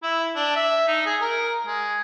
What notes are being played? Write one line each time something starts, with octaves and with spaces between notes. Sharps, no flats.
E4
D4
E5
D#4
G#4
A#4
G#3